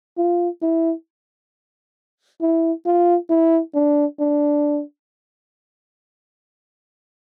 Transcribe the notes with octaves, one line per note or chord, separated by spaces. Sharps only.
F4
E4
E4
F4
E4
D4
D4